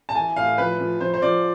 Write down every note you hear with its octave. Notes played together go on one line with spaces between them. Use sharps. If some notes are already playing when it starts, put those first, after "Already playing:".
A5
E3 G#5
A2 F5
F3 B4
F3
F3 C5
C5
F3 D5